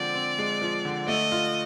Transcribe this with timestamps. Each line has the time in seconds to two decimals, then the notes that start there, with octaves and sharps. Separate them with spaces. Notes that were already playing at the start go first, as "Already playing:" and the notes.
Already playing: D3 F3 G#3 C4 D5
0.15 C4
0.39 G#3
0.62 F3
0.85 D3
1.08 A3 D#5
1.32 F4